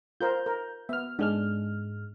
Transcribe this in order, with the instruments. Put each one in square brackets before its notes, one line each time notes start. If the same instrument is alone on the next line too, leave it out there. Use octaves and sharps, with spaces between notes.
[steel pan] F4 A#4 C5 [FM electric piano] G6
[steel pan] A#4
[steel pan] B3 [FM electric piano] E5 F6
[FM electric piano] G#2 G#3 F6 [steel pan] D4